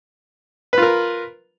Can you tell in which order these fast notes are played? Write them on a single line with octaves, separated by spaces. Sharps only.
B4 F4 A#4